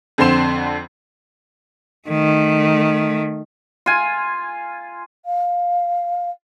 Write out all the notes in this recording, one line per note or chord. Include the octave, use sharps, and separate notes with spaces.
F2 D3 C4 C6 E7
D#3 A3
F4 G#5
F5